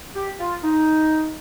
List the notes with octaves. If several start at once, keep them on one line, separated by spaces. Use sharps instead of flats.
G4
F4
D#4